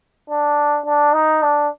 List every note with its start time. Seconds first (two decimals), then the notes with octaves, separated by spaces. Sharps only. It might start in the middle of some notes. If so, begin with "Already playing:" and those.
0.30 D4
0.86 D4
1.14 D#4
1.43 D4